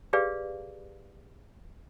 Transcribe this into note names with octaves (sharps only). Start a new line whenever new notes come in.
G4 G#4 B4 D5 F5